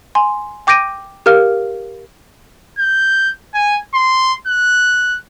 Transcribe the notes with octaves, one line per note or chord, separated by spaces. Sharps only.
G#5 C6
G5 D6 G6 A#6 D7 D#7
G4 A#4 F5 F6
G6
G#5
C6
F#6